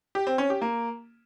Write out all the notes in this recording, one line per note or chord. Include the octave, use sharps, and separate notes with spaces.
G4
C4
C#4
G4
A#3